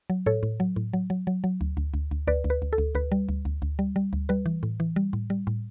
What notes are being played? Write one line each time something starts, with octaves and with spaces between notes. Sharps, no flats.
F#3
A2 A4 C#5
A2
F#3
A2
F#3
F#3
F#3
F#3
D2
D2
D2
D2
D2 B4 D5
D2
B4
D2
A4
D2
D2 B4
G3
D2
D2
D2
G3
G3
D2
G3 B4
E3
A2
E3
G3
A2
G3
A2